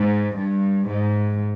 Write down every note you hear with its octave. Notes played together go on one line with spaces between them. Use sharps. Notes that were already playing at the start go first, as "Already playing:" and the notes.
Already playing: G#2
G2
G#2